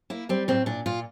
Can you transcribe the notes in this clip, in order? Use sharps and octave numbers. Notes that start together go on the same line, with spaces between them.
A#3 E4
G3 C4
A2 C4
A#2 D4
A#2 F4